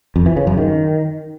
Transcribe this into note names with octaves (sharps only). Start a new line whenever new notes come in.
F2
E3
C#3
F#2
D#3